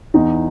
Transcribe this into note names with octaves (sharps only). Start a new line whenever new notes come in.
E2 D#4